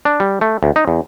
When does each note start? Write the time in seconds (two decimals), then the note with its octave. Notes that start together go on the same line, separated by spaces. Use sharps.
0.05 D4
0.20 G3
0.41 A3
0.63 D2
0.76 D#4
0.88 E2